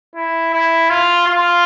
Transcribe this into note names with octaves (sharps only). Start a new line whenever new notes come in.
E4
E4
F4
F4